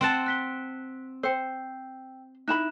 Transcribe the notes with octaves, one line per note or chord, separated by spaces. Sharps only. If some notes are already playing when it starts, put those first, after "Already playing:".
C4 F#5 A5
F#6 B6 G7
C5 G5 E6
D#4 E4 B5 F#6 E7